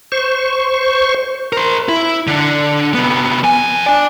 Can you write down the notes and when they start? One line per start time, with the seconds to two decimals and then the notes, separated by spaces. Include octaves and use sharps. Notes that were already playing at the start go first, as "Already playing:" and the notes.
0.12 C5 C#6
1.53 A#4 C5
1.89 E4
2.27 D3 D4
2.94 C3 B3
3.43 F2 G#5
3.86 D4 D5